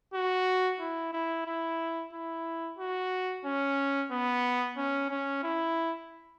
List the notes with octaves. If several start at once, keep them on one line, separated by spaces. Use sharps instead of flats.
F#4
E4
E4
E4
E4
F#4
C#4
B3
C#4
C#4
E4